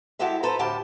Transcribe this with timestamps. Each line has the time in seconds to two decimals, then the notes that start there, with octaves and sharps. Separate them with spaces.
0.19 G#3 E4 F#4 G4 A4 E5
0.43 A4 B4 C5 E5 A#5
0.59 D2 A2 E3 G4 A5